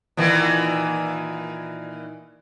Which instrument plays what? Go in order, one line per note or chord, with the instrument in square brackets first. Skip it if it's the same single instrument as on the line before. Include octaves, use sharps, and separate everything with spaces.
[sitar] A#2 D#3 E3